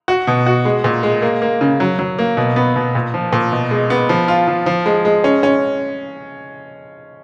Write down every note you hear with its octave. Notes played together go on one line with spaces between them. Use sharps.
F#4
B2
F#4
G#3
A#2
G#3
A#3
A#3
C#3
F#3
F#3
A#3
B2
B3
B2
A#2
F3
A#2
B2
G#3
B3
F3
F4
F3
F3
G#3
G#3
C#4
C#4